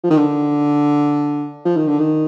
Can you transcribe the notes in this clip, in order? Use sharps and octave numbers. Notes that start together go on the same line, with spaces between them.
F3
D#3
D3
F3
D#3
D3
D#3